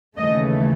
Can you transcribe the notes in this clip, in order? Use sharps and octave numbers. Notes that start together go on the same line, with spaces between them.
D#2 C#3 E3 A3 D#5